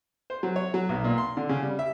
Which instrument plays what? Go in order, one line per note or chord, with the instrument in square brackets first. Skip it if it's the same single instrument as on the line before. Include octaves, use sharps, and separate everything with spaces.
[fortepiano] C5
F#3
C#5
F#3
B1
A#2
C6
D3
C#3
G3
E5